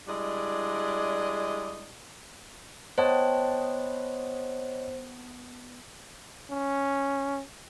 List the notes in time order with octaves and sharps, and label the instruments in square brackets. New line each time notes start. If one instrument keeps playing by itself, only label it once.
[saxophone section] G3 G#3 D4 E4 D5 D#5
[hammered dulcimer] B3 G5 A5 [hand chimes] C5 [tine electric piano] C#5 D#5
[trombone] C#4